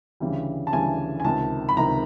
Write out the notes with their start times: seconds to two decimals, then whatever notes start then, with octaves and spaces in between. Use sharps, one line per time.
0.20 D2 C#3 E3 G3
0.67 A5
0.72 D2 C#3 E3 G3 G#5
1.20 G#5
1.24 C#2 C3 D#3 A5
1.69 B5
1.76 C#2 C3 D#3 A#5